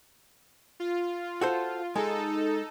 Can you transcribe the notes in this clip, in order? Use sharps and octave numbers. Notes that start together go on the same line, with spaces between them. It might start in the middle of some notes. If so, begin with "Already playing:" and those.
F4
F#4 A4 C5
G#3 D#4 A4